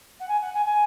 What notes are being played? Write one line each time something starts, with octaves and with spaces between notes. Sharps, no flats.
F#5
G#5
F#5
G#5
G#5